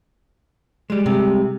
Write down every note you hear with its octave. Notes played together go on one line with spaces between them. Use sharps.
G3 G#3
C3